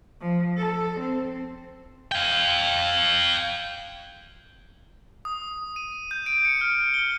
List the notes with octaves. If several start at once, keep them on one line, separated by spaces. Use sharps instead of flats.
F3
A4
C4
F5 G5
D#6
D#7
G6
D7
C#7
F6
G7